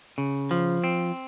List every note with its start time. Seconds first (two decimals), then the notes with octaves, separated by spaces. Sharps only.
0.18 C#3
0.51 F3
0.84 C4